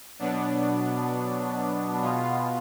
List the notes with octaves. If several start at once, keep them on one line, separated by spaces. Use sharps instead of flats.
B2 F#3 B3 D4
B2 G#3 B3 F4